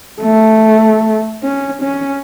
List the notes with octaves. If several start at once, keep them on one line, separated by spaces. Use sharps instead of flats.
A3
C#4
C#4